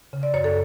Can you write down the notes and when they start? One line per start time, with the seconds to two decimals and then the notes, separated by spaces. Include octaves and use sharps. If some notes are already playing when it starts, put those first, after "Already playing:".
0.13 C#3
0.23 D5
0.34 F#2 C#5
0.44 A4